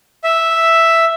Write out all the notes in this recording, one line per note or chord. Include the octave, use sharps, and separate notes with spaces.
E5